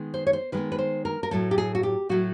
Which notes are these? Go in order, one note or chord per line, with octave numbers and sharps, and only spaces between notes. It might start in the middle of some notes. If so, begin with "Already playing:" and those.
Already playing: D#3 G#3 B3
C5
C#5
C5
D#3 G#3 B3 B4
B4
C5
A#4
A#4
A2 F#3 A3 A4
G4
G#4
F#4
G4
A2 F#3 A3 F#4